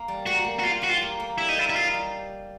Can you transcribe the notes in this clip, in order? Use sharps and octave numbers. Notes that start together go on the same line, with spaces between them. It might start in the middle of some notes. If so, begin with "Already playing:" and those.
Already playing: A#3
G3
A#3 F#4
A#3
F#4
F4 G4
F#4 G4
F4
A#3
A#3
G3 E4
D#4
A#3 E4
E4
D#4 F4
G3